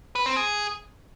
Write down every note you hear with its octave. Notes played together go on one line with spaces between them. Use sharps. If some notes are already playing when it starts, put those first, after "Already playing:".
B4
C4
G#4